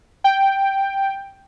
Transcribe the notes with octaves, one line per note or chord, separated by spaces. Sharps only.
G5